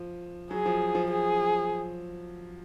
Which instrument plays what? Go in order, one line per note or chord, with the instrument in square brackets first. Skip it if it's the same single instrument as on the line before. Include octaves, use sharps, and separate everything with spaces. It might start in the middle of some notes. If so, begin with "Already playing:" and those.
Already playing: [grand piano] F3
[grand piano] F#3 [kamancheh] G#4
[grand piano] F3
F3
[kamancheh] G#4